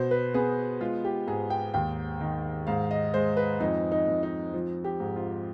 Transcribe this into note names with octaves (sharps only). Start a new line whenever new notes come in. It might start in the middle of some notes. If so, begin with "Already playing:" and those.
Already playing: B2 C5
B4
B3 G#4
G#3 F4
G4
G#2 G#4
G5
D#2 G5
D#3
G#2 F5
D#5
G#3 C5
B4
F2 D#4
D#4
F2
D#4
F3
G4
G#2
F4